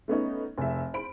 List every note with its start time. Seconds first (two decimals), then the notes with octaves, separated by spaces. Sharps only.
0.08 A3 B3 C#4 D#4
0.58 F1 E5
0.94 C5 B5 D7